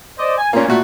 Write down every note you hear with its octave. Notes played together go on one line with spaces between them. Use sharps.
C5 D5 D#5
G#5
A#2 A#3 C#4
A#2 A3 F#4